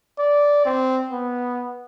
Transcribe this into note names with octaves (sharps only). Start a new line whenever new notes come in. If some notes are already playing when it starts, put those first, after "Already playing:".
D5
C4
B3